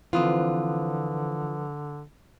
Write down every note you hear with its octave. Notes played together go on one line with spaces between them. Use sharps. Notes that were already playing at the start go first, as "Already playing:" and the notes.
D3 E3 F3 C4 F4 B4 D#6